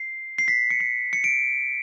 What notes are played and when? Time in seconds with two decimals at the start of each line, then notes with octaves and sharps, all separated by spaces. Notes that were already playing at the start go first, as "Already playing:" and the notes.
Already playing: C7
0.38 C7
0.48 B6
0.70 C#7
0.80 C7
1.13 C#7
1.24 D7